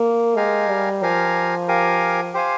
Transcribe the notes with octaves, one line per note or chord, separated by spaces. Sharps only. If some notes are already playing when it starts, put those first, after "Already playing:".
Already playing: A#3
G#3 G4 A#4 F5 G#5
G3
F3 G4 A#4 F5 G#5
G4 A#4 F5 G#5
G4 C5 F5 G#5